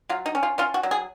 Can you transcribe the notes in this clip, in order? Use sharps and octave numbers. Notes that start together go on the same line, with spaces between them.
F#3 F4
D#4
C#4
F4
C#4 F4
F#4
F#3
G#4